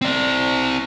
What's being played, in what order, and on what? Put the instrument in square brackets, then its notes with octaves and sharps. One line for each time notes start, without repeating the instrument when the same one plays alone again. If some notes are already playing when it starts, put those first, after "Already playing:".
[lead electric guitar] C4 D5